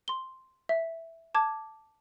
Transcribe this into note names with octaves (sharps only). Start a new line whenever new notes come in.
C6 G7
E5
A5 D6 G#6